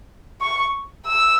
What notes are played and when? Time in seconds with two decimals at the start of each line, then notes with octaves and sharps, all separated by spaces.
0.41 C#6
1.06 E6